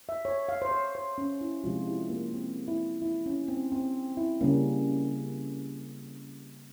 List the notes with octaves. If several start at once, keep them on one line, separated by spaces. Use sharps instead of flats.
E5
C#5
F5
C5
C#5
C5
C#4
E4
C3 F3 G#3 F4
E4
A#3
C4
E4
E4
C#4
C4
C4
E4
C#3 G3 A#3 C#4